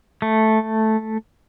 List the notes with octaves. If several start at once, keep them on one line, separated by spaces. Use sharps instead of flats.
A3